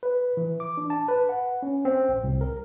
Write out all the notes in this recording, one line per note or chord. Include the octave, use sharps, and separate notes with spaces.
B4
E3
D6
D4
A5
B4
F#5
C#4
C4
A1
C2
A#4